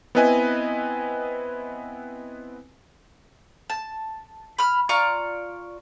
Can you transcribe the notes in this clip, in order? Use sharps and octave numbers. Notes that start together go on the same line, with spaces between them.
B3 C4 E4 B4 D#5 G#5
A5
B5 F6
F4 D5 A#5 C#6